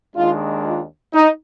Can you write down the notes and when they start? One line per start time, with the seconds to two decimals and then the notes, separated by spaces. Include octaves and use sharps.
0.15 D#2 D#3 G#3 D4 F4
0.64 F4
1.13 D#4